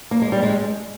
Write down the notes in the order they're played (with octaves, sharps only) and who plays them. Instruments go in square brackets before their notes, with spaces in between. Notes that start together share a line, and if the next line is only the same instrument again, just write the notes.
[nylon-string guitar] A#3
G#3
G3
G#3